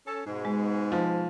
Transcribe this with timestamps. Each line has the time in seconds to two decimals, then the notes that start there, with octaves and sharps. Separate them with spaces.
0.07 C#4 A4
0.26 G#2 B2
0.45 G#3
0.92 F3